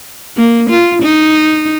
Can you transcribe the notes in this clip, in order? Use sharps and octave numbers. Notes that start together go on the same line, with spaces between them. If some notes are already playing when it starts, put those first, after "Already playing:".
A#3
F4
D#4